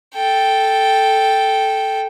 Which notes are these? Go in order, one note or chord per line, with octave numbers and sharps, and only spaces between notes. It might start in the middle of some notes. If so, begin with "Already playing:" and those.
A4 G5